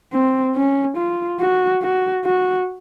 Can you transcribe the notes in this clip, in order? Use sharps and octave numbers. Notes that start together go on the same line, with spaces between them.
C4
C#4
F4
F#4
F#4
F#4